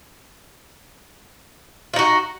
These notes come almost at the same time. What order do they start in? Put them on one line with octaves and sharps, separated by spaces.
F4 D#4 F#4